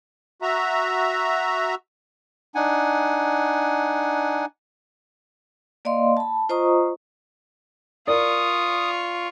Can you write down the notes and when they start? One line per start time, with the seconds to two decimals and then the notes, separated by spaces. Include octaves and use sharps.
0.42 F#4 E5 A#5
2.55 D4 D#4 F#5 G#5
5.85 A#3 D5 D#5 F5 C6
6.17 A5 B5
6.49 F4 C5 D#5 A#5 C#6 D#6
8.07 F4 A#4 D5 C#6 D#6